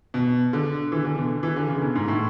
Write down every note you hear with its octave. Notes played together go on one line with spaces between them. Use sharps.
B2
D3
E3
D3
B2
E3
D3
C#3
B2
G#2
A2